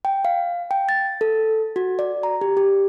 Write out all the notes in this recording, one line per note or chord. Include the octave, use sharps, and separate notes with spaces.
G5
F5
G5
A6
A4
F#4
D5
A#5
G4
G4